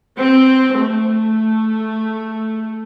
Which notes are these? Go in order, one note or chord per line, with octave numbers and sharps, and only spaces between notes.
C4
A3